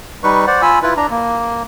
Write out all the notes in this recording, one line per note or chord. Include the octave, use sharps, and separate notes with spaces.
G3 D#4 B4 C#6
C5 D5 F#5
F4 G#5 B5 E6
E4 F4 B4
D4 A#5
A#3